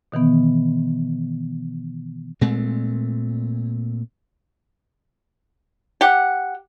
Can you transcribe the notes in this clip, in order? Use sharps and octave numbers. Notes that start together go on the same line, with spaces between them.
B2 D#3 E3 B3
A#2 G#3 A3 C4
G4 F#5